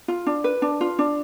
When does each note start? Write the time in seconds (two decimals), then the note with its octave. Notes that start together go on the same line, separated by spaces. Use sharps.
0.08 F4
0.26 D4
0.44 B4
0.62 D4
0.81 F4
0.99 D4